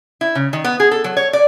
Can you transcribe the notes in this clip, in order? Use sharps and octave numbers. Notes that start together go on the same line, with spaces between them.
E4
C#3
D#3
B3
G#4
A4
F#3
C#5
D5